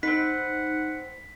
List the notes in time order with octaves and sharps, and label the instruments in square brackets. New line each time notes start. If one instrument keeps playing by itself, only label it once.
[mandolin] C4 B4 [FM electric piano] D#4 [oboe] F#5 [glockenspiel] B6